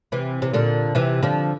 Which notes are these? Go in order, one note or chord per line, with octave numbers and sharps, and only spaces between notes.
C3 E3
C3
A#2 D3
C3 E3
D3 F3